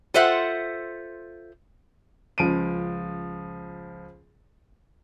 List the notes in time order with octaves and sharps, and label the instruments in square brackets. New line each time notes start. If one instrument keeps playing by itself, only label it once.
[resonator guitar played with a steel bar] F4 A4 C5 E5 F#5
[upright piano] C#2 F3 D7 D#7